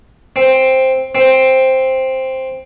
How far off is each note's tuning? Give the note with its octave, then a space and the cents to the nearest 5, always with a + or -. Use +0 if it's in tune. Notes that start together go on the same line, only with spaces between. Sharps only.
C4 +5
C4 +5